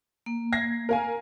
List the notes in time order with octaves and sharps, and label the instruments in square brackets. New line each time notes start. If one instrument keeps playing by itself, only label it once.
[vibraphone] A#3
[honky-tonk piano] G#6 A#6 C7
A#4 F5 G#5